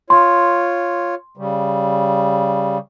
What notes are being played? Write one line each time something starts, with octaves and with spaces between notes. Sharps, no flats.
F4 C#5 C6
C#3 G3